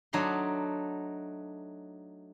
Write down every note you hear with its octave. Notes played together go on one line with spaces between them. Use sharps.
F#3 A3 D4 D#4 C6